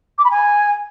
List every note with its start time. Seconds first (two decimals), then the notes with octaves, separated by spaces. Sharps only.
0.18 D6
0.24 B5
0.31 G#5